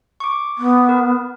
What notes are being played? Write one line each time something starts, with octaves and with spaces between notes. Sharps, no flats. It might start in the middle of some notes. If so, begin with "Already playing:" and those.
C#6 D6
B3
A#4